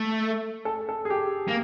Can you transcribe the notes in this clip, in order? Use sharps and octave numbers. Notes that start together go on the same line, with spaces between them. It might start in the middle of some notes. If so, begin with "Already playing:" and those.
Already playing: A3
A4
A4
G#4
G4
A#3